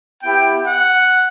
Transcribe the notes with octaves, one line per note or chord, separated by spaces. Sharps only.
B3 E4 G4 G5
F#5